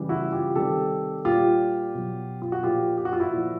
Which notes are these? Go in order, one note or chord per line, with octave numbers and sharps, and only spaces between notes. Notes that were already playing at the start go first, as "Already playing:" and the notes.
Already playing: C#3 E3 G3
E4 F#4
F4 G4
C3 D#3 G3 G4 A4
A#2 G3 F4 G4
B2 F#3
F4
F#4
A#2 F3 F4 G4
G4
F#4
F4
E4 F#4
A#2 F3